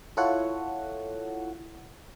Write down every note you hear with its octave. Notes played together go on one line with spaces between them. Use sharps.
E4 F4 A4 C#5 F#5